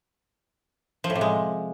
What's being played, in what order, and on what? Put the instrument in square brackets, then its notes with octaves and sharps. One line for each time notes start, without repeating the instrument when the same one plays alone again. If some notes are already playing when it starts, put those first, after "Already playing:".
[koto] F3
A2
C3
G#3